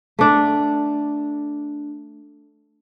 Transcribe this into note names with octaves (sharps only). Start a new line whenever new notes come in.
A3 D4